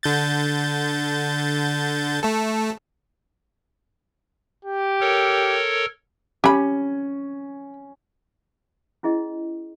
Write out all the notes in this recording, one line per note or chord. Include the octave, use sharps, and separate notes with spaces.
D3 G6 A6
A3 A4
G4
A4 A#4 C#5
C#4 G4 B5
C#4 E4 G#4 D#5